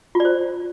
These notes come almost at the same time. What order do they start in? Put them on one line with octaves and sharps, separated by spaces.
F4 D5 C5